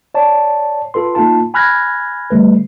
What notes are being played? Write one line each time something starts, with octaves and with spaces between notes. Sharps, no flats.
C#5 D5 A5
F4 A4 B4 C6
A#3 D#4 F4 A5
G#5 B5 F6 F#6 G#6 A#6
D3 G3 A3 B4